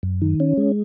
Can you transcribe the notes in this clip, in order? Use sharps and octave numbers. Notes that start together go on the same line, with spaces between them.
F#2
D#3
C#4
G#3